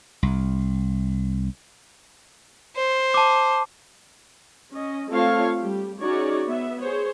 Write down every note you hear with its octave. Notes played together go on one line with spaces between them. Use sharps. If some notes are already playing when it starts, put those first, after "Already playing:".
C2
C5
A5 D6
C#4 D#5
A3 C4 F4 A4 C#5 F5
G3 G4
C#4 D#4 F#4 G#4 C#5 D5
B3 E5
G#4 C5 C#5